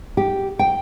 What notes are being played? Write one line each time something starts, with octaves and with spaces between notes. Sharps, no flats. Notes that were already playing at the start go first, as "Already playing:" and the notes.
G4
G5